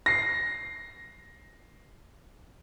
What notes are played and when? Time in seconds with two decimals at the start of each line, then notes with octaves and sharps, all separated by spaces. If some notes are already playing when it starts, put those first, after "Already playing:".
0.06 A#6 C7